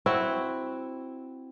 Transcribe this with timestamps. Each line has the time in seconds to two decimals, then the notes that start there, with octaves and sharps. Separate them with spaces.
0.06 C4 E4 F#4